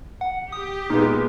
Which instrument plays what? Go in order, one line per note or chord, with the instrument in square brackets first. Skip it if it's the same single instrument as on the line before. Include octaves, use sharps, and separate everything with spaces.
[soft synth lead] F#5
[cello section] G4 [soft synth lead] D#6
[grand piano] A#2 G#3 B3 [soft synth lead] D#4